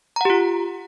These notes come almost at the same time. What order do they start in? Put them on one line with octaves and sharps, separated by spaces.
A#5 F#5 G4 F4